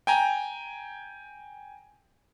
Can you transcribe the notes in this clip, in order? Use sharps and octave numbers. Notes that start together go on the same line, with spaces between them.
G5 G#5 A#5